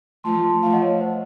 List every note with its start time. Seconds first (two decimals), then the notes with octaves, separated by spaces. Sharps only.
0.24 F3 A3 A5 C6
0.44 A5 C6
0.63 F3 A3 F5 A5
0.73 D#5 F#5
0.82 C#5 F5
1.01 C5